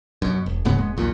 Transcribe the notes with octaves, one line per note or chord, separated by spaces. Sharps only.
F#2 B2
E1
D1 G#2 C#3 B3
E1 G#3 B3
B1 E2 A#2